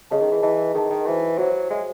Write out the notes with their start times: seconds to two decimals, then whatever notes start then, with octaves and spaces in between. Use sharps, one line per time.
0.11 C#3 G#4 D#5 A5
0.22 D#3
0.32 E3
0.42 E3 G#4 D#5 A5
0.74 D#3 G#4 D#5 A5
0.90 D#3
1.06 E3 F#4 C5 E5
1.38 F#3 F#4 C5 E5
1.70 G#3 F#4 C5 E5